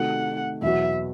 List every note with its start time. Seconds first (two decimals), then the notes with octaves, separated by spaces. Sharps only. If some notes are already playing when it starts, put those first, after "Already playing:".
Already playing: C3 D#3 A3 D#4 F#4 F#5
0.62 E2 B2 F#3 B3 F#4 E5